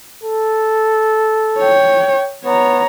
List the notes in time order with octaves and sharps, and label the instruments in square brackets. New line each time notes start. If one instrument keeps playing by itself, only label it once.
[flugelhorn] A4
[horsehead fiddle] C#5 G5
[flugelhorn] B3 [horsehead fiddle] C#5 A#5